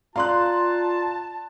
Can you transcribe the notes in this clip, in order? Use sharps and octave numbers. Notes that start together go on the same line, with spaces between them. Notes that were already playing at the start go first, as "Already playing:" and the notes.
F4 D5 F5 A5 A#5 C6 F#6